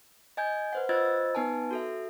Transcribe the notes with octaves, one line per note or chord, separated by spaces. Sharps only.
D#5 G#5 G6 G#6
B4 C5 F#5
F4 C5 D#5 E6 G#6 A6
B3 D#4 B4 G#5 A5
F#4 A4 E5